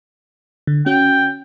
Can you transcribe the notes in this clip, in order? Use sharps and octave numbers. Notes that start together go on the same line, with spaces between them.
D3
C#4 F#4 G5